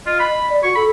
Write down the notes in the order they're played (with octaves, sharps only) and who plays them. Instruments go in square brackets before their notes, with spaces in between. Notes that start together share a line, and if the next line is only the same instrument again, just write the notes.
[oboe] F4 [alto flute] D#5
[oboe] B5
[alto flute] D5
[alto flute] F#4 [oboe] C#6
[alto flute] A4 [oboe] B5